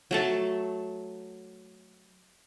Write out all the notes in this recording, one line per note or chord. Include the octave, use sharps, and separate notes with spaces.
F#3 A3 A5